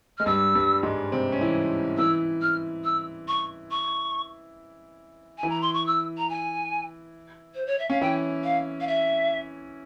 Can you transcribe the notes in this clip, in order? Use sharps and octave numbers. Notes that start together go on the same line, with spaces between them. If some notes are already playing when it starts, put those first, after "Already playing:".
G#3 F6
G2 G3 E6
G2 G3
G#2 G#3
C3 C4
C#4
E3 E4
E3 E4 E6
F6
E6
C#6
C#6
E3 E4 G#5
A#5
C6
C#6
E6
A#5
G#5
C5
C#5
E5
C#4 F5
E3 E4 G5
F5
F5
E5